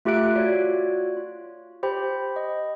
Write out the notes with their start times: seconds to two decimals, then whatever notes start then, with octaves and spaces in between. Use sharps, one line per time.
0.05 A3 F4 G4 E5 F#6 D7
0.36 F4 F#4 C#5 D5
1.17 F4
1.83 G4 C5 G5 B5
2.36 D#5